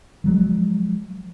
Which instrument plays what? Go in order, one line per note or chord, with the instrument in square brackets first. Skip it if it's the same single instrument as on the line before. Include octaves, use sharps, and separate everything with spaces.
[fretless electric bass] F3 F#3 G#3